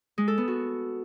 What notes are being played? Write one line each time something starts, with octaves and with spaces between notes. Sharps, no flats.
G#3
A4
B3
F#4